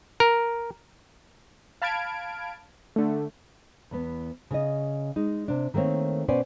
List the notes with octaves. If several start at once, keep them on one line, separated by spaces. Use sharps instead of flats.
A#4
F5 A5 B5 F6 G#6 D7
D3 A3
E2 B3
C#3 D#5
G#3 D#4
C3 D4
D#3 A3 A#3 C4 C#5
B2 B3 C#4 C5 D5 G#5